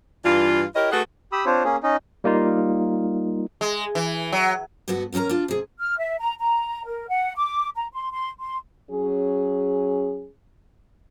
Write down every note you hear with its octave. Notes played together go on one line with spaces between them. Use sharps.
G2 E3 D4 F4
E4 G4 A#4 C#5 D#5
A3 F#4 G#4 A4 B4 F#5
G4 B5 D#6 E6
C4 D4 F4 C5 C#5
A#3 C#4 G#4
C#4 D#4 D#5
G3 A#3 D#4 F4
G#3
E3
F#3
D2 G2 B3 F#4 A4 F#5
E2 A#3 C#4 A#4 A#5
D4 F4
C3 G#4
F6
E5
A#5
A#5
A#4
F#5
D6
A#5
C6
C6
C6
F#3 C#4 G#4